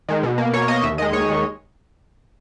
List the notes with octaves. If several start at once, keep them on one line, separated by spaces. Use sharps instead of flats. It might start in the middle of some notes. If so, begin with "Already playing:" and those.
D#3 G#3
B2
A#3
B2 C#5
A#3 D#5
D#2 E5
D#3 G#3 D#5
D#2 C#5
D#3 G#3